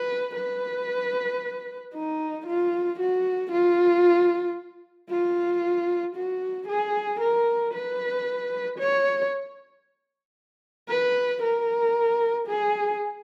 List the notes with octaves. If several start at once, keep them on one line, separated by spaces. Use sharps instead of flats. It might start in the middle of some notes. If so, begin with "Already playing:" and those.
Already playing: B4
B4
D#4
F4
F#4
F4
F4
F#4
G#4
A#4
B4
C#5
B4
A#4
G#4